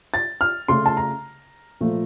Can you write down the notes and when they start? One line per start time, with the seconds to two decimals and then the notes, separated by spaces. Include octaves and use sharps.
0.14 A6
0.41 F6
0.68 C#3 A3 C6
0.86 A5
0.97 A#5
1.81 A#2 F3 A3